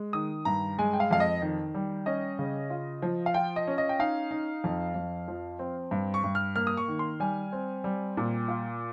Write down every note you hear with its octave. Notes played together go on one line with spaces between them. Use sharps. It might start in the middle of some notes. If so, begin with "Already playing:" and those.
Already playing: G#3
D#3 D#6
G2 A#5
G#3 G#5
G5
F5
F2 F5
D#5
D#3
G3
C#4 D#5
C#3
F4
F3
F5
F4 G5
D#5
C#4
D#5
G5
D#4 F5
D#4
F2
F2
F3
C4
G2
C#6
G2
F6
A#3 F6
D#6
C#6
D#3
C6
G3 G#5
C4
G3
A#2
F4